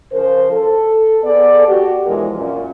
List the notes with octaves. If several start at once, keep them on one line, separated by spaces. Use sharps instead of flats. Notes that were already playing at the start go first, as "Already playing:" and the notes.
C#3 F3 A#4 C5
A4
B3 G#4 A4 D5
F#4 G4
B2 E3 F3 G#3 D4 A#4
F#2 A#2 C#4